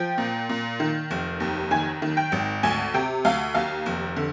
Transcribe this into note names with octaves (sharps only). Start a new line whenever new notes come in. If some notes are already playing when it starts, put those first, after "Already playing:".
Already playing: F3 G5
A#2
A#2
D#3
F1
D#2
D#3 G#5
D#3
G5
G#1
D2 G#5
C3 G5
D2 F5
D#2 F5
F1
D3